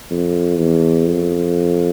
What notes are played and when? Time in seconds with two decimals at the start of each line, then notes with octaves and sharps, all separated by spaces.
0.11 F2
0.58 E2
1.04 F2